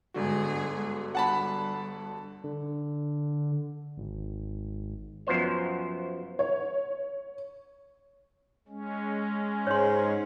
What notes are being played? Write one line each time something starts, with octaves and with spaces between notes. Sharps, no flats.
G1 G#2 D3 F#4 G#4
G3 F#5 A5 B5
D3
G#1
F#2 F3 B3 C5 C#5
C#5
G#3 C#4
G#2 C#5 C6